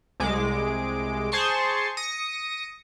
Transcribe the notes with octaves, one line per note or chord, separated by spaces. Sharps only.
C2 G#3 D6
G#4 C5 A5 C6 C#6
D#6 A#6 C#7